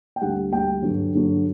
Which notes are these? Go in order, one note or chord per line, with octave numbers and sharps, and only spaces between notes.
G5
D2 D3 G3 F#5
D2 D3 G3 G5
G2 D3 F#3
G2 D3 F#3